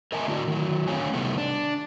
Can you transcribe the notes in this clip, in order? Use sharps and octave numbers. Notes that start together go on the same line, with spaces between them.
A#4 D#5 E5 G#5 A5
D3 A3 E4 F#4 D5
D#3 F#3
D3 A3 C4 C#5 F5 G#5
C3 D#3 G3 A3 B3
D4